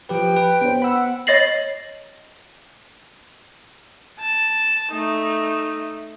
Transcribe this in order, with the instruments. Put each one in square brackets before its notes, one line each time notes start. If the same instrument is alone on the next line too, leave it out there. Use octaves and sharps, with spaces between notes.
[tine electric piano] F3 G4 B4 [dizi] G5
[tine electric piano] B4
[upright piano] B3 C5
[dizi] F#5 [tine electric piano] B5 E6
[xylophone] C#5 D#5 A6 A#6 C7 F#7
[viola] A5
A3 D#4